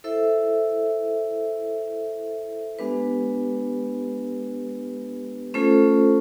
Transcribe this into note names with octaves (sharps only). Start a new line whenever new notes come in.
E4 A4 C5 E5
G#3 B3 D4 G4 B4
A3 C#4 F4 A4 C5